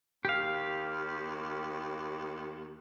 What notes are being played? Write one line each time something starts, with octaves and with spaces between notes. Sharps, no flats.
D#2 G4 F5